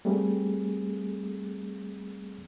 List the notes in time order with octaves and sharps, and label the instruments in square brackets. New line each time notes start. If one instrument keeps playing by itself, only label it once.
[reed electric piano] G3 A3 A#3 C4 G#4 A4